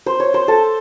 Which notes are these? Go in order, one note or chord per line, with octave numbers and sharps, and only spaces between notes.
C5
C#5
C5
A4